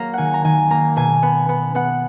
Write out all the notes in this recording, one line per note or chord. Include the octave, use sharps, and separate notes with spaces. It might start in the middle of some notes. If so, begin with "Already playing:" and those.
Already playing: F#3 A#3 A#5
D#3 F#5 G#5
A#5
D#3 G#5
A#3 A#5
B2 G#5
B3
B3
B3 F#5